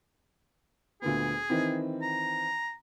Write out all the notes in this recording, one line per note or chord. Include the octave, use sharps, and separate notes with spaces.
D2 A#2 B3 G#4
D#3 E3 C4
A#5